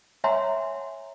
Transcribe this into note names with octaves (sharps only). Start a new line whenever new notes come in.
C#5 E5 F#5 G#5 A#5 C6